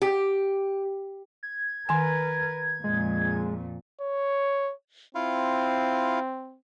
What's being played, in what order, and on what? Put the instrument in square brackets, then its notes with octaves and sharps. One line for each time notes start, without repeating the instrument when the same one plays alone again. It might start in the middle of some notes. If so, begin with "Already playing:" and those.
[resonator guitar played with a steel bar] G4
[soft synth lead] G#6
[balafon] D#3 G#5 [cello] A#4 B4
[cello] F2 A#2 [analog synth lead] G#3
[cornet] C#5
[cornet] C4 [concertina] E4 F4 F5